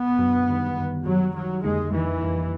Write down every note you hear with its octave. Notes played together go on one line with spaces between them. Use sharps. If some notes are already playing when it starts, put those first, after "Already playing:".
Already playing: B3
F#2 D3 F#3
F#2 D#3 G3
F#2 D#3 G3
F#2 D#3 F#3 G3
F#2 D#3 F#3 G3
F2 D3 G3 G#3 A#3 D#4
F2 D3 E3 G3 A#3 D#4
F2 D3 G3 A#3 D#4